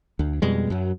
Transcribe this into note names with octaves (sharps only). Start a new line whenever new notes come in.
D2
F2 B2 G3 G#3
F#2 F#3